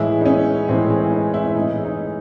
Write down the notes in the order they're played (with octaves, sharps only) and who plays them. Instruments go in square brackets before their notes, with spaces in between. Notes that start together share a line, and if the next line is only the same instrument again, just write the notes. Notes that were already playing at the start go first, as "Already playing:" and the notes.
Already playing: [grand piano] A2 E3 G#3 [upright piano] E4
[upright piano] D#4
C#4
[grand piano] A2 E3 G#3 [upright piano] C4
[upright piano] C4
D#4
E4
E4
[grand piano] A2 E3 G#3 [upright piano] D#4
[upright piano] D#4